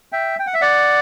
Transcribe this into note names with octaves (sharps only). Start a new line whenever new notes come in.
E5 G5
G5
F#5
E5
D5 F#5